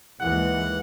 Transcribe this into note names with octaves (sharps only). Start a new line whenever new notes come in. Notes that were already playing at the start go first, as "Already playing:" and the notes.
D#2 E3 G#3 F#5